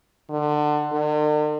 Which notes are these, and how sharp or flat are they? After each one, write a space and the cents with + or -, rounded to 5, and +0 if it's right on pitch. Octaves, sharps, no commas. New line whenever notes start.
D3 +25
D3 +45